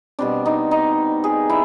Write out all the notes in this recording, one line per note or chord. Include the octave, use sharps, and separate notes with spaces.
B2 G3 C4 D4
D#4
D#4
G#4
E4